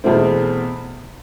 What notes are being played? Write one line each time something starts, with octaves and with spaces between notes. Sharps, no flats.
E2 B2 A3 C4